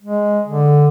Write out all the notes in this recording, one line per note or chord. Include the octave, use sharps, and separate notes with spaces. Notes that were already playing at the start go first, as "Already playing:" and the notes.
G#3
D3